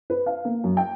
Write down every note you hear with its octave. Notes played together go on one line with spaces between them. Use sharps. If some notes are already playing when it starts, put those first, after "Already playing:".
B4
F5
A#3
F#2
G5